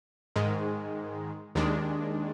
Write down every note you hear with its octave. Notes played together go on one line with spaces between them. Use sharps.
G#2 D#3 G#3
D#2 D#3 G#3 D4